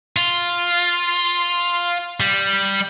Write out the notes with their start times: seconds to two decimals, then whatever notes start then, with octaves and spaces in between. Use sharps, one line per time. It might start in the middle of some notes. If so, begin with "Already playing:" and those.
0.17 F4
2.20 G3